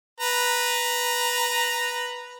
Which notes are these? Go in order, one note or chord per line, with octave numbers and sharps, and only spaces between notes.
B4 A#5